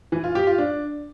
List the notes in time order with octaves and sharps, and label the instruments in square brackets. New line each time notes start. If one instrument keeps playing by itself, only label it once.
[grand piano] E3
F4
G4
F4
D4